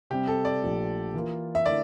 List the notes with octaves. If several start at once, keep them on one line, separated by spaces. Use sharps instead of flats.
C3 G3 C4 G4
A4
D5
A#1 A#2 F3 A3
E3 A#3 F4
E5
D3 A3 E4 A#4 D5